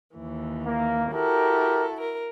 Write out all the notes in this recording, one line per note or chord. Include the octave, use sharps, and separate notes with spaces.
D#2 E3
A#3
E4 F#4 G4 A4 A#4
A#4